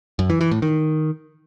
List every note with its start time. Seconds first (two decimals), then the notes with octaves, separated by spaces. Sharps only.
0.19 F#2
0.30 E3
0.41 E3
0.51 A2
0.62 D#3